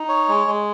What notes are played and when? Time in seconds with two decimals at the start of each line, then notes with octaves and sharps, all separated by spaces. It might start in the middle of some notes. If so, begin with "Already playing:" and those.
Already playing: D#4
0.09 C#5
0.29 G#3
0.48 G#3